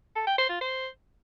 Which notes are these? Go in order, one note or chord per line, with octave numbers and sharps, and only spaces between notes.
A4
G5
C5
F4
C5